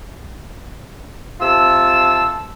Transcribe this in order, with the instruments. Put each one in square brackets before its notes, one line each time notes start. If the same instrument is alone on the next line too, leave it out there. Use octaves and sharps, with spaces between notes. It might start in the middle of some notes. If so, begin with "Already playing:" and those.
[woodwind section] C3 F4 A4 A5 E6